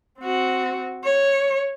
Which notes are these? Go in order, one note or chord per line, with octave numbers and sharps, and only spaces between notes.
C4 F#4
C#5